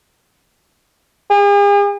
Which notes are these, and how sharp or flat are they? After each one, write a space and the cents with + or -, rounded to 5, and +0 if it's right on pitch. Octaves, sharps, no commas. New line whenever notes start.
G#4 -45